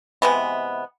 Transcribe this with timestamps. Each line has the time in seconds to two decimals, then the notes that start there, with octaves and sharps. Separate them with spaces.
0.22 C3 E3 G#3 B3